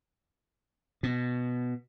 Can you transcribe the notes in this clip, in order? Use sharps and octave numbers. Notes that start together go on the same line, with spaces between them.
B2